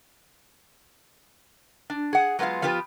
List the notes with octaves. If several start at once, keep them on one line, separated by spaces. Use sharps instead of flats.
D4
G#4 F#5
F#3 G#3 B3 F4 F5
F3 B3 F4 G4 B4